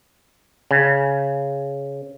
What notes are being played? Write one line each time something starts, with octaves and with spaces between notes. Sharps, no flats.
C#3